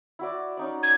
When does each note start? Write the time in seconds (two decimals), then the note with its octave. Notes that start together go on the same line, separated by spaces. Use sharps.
0.19 E4 F#4 D5
0.57 C#4 D#4 D5
0.83 G#6